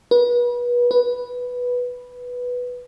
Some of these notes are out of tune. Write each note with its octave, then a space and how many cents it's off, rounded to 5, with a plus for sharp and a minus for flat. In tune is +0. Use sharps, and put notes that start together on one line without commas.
B4 -35
B4 -5